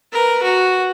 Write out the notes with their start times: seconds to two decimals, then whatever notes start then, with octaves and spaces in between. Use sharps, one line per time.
0.12 A#4 B4
0.43 F#4